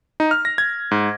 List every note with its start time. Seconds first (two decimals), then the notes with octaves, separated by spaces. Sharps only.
0.20 D#4
0.31 F6
0.45 A#6
0.58 G#6
0.91 G#2